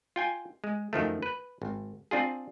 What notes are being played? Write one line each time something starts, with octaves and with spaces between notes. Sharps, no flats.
F4 G5 G#5
G#3
F#2 D#3 F3 A3
B4
G#1
C4 D4 F4 G#4